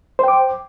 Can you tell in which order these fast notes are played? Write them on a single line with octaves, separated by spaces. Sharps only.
C5 G5 D6